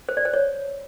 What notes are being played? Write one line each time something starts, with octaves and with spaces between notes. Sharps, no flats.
C5
D5
C5
C#5